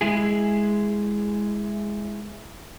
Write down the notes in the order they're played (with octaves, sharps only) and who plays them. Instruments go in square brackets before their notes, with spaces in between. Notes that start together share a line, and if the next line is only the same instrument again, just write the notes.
[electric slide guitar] G#3 E4 G#4